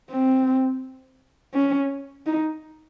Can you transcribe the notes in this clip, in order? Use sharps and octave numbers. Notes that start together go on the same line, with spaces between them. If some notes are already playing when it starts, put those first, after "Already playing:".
C4
C#4
D#4